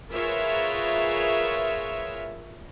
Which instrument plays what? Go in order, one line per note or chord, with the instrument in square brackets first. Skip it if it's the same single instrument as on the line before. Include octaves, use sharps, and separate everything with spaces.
[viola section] F4 G#4 A#4 B4 C#5 E5